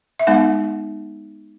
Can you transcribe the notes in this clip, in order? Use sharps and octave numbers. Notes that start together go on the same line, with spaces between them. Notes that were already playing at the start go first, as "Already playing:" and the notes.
E5
G#3 B3 D#4 F#5